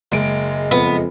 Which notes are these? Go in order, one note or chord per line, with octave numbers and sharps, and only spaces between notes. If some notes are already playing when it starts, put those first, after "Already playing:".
F#1 G#3 D#5 D7
F2 B3